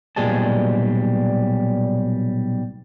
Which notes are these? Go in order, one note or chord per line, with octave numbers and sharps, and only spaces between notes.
B1 A#2 G3 G#4 D#5 A5